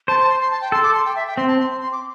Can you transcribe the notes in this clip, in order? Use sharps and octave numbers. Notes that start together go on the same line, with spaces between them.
C5 A5
A5
C6
C6
A5
G5
A4 C6
D6
C6
G5
E5
G5
C4 C6
A5
C6
C6
C6
D6